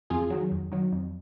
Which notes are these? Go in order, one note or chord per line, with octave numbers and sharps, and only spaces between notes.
F2 F4 G#4
D#3 F#3
F2
D#3 F#3
F2